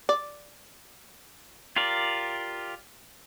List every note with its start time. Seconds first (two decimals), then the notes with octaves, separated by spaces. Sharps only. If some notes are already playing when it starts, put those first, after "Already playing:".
0.09 D5
1.76 F4 G4 A#4 D5